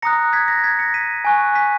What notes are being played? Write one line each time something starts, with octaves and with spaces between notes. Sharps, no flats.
A#5 D#6 F#6 A#6 C#7
G#6 B6
A#6
G#6 B6
A#6 C#7
B6 D#7
G#5 C#6 F#6
B6 D#7